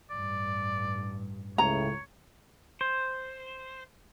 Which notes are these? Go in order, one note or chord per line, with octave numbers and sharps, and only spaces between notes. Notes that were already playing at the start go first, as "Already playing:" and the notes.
A1 G2 D5
C#2 A2 C#3 C#5 A#5
C5